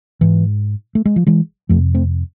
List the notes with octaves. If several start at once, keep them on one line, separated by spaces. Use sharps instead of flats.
G#2 E3
A3
G#3
F3
E3 G#3
F2 C3 F3 A3
A3 C4